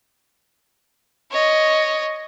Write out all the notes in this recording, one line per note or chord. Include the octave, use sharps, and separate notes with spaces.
C#5 D#5